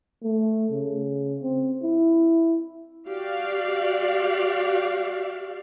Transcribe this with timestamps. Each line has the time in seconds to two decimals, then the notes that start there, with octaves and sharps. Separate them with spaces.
0.23 A3
0.72 C#3
1.42 C4
1.83 E4
3.08 F#4 G4 D5 F5